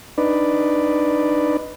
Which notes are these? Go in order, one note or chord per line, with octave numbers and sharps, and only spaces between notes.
D4 D#4 B4 D5